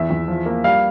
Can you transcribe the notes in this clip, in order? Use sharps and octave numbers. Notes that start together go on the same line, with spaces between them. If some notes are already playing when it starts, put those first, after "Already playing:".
Already playing: E2 E5
E2
F3
A#3
G3 F5